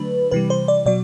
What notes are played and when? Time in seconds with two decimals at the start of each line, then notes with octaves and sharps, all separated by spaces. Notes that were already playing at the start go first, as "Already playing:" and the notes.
Already playing: D3 F#3 A3 D4 B4
0.31 C3 E3 G3 B4
0.50 C5
0.68 D5
0.86 B2 F#3 D5